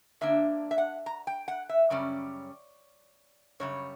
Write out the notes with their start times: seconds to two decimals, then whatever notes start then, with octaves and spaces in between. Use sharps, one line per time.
0.21 D3 A#3 D4 E5
0.71 E5
0.78 F#5
1.06 A#5
1.27 G5
1.48 F#5
1.69 E5
1.90 F#2 C#3 G3 C#4 D5
3.60 F#2 C#3 G3 C#5